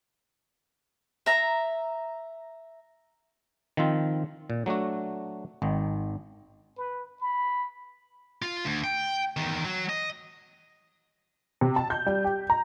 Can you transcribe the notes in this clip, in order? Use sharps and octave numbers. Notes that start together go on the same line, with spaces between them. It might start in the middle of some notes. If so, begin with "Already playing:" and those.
E5 A#5
D#3 F3 C4 F4
A#2
F#3 A3 D4 F#4
G#1 D#3
B4
B5
F4
D2
G5
E2 D#3
F#3
D#5
C3
A5
G6
G3
G4
A#5